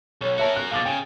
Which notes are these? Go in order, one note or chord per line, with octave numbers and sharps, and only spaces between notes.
B1 C#5
F#4 A#4 C#5 E5 A5
F#6
B2 F5 D6 A6
C#3 G5